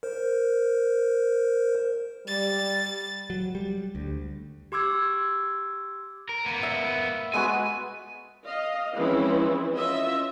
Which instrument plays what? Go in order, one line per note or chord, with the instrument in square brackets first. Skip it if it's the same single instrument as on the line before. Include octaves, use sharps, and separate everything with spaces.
[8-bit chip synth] A#4 C5
[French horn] G3 [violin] A6
[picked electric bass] F#3
G3
D2
[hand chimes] G4 C6 D6 E6 G#6
[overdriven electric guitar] A#4
A#3 B3
[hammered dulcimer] E5
[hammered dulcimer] G#3 B3 F#4 [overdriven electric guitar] G#5
[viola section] D#5 F5
E3 F3 G#3 C4 C#4 E4
C#4 F4 D#5 E5